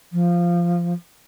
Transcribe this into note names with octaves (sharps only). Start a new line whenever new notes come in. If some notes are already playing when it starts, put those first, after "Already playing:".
F3